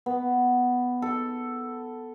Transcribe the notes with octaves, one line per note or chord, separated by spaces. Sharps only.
B3
A4